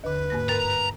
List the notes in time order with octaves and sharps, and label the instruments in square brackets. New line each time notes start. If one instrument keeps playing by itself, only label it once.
[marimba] D#2 D3 [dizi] B4
[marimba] G#2 A#3 A#6
[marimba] G2 A#4 A6 [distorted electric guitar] A#5